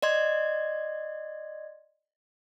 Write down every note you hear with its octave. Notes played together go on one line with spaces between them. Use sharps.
D5 D#5 C6 G#6